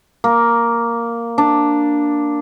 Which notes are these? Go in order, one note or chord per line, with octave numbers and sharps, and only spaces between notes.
A#3
D4